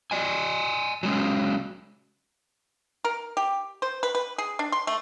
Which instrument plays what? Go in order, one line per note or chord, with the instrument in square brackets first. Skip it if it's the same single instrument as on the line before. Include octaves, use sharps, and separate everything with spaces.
[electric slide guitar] D5 D#5 G#5
F#3 G#3 C#4
[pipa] A#4
G4
C5
B4
B4
G#4
D4
C6
A3